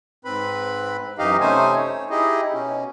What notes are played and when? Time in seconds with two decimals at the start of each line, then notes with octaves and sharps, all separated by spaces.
0.25 G#2 C4 B4 B5
1.18 F#2 E3 D#4 G4 D#5 F5
1.40 C3 A3 C#4 D#4 C5 G#5
1.76 C#5
2.10 D#4 E4 G4 G#4 D#5
2.53 B2 C#4